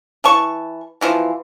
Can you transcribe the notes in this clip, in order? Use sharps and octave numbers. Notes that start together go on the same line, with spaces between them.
E3 A5 C#6
B2 E3 F3